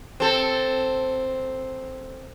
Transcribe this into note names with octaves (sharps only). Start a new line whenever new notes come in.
C4 A4